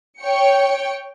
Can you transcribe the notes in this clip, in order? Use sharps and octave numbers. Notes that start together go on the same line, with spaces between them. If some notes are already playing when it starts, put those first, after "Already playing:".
C#5 G5 C#7